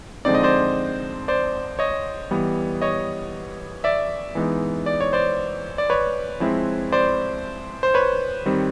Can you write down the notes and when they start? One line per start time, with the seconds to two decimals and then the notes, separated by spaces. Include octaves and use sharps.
0.25 D3 F3 G#3 C4 D#4 D5
0.35 D#5
0.43 C5 D5
1.28 C5 D5
1.79 C#5 D#5
2.31 E3 G3 B3
2.82 C#5 D#5
3.84 D5 E5
4.35 E3 G#3 B3 D#4
4.86 D5
5.01 C#5
5.13 C5 D5
5.78 D5
5.90 B4 C#5
6.40 F3 G#3 C4 E4
6.92 C5 D5
7.83 C5
7.94 B4 C#5
8.46 D#3 G3 C4